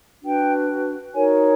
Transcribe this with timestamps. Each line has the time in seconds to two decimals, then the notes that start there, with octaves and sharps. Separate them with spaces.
0.22 D4 F#4 B4 G5
1.12 D#4 F#4 A#4 C#5 G#5